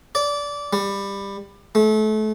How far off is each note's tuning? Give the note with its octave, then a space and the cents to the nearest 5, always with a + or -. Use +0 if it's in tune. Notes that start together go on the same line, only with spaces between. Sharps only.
D5 -20
G3 +20
A3 -30